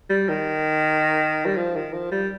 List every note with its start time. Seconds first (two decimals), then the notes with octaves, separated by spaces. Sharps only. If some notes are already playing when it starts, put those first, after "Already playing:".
0.10 G3
0.29 D#3
1.46 G3
1.56 F3
1.76 D#3
1.93 F3
2.12 G3